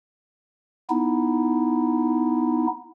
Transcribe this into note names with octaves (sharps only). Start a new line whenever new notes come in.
B3 D#4 E4